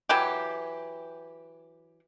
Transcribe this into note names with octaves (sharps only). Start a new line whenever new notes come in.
E3 F#3 G4